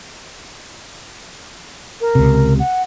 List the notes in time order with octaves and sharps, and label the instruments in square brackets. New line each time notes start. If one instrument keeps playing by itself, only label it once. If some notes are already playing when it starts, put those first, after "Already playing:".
[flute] A#4
[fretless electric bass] C#2 C3
[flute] F#5